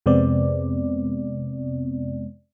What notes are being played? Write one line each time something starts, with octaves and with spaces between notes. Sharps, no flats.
F2 C3 G#3 B3 C4 D5